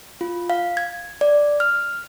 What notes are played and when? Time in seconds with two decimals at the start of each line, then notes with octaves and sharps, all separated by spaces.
0.21 F4
0.50 F5
0.77 G#6
1.21 D5
1.60 F6